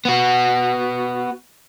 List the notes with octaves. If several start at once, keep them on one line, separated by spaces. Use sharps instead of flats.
B3 F#4